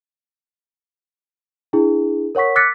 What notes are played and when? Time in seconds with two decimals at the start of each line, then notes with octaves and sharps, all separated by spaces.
1.73 D4 E4 G#4
2.35 A#4 C#5 F#5 C#6 B6
2.56 D6 E6 F#6 A6 B6 C#7